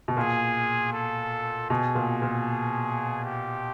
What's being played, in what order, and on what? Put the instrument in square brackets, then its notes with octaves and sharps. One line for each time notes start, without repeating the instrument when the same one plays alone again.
[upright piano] B2
[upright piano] A#2 [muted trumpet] G#4
[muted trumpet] A4
[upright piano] B2 [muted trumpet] G#4
[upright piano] A#2
A#2
[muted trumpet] G4